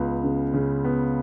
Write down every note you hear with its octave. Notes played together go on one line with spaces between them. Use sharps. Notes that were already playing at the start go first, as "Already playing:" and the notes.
Already playing: C#2 B3
C#3
C#3
B3